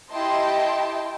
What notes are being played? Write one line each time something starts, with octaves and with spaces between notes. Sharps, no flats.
E4 G4 D#5 G5 A5 C6